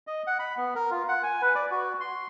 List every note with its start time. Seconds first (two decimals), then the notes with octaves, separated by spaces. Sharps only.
0.07 D#5
0.27 F#5
0.39 B5
0.57 B3
0.75 A#4
0.91 F4
1.09 F#5
1.23 G#5
1.42 B4
1.55 D5
1.71 F#4
2.01 C6